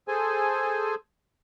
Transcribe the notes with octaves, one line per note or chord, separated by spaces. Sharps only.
G#4 A4 C5 G#5